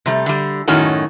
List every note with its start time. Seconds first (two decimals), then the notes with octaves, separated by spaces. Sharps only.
0.06 C3 G3 A3
0.26 D3 G3
0.68 F#2 A2 D#3 C#4 D#4 F#4